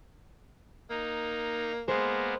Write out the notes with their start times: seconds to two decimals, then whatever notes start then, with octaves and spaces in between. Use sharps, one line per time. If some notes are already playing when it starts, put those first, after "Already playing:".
0.90 A#3 D#4
1.88 G#3 A#3 B3 C5